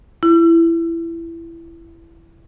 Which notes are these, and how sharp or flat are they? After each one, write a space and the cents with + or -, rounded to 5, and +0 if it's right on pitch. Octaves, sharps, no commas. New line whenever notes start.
E4 +15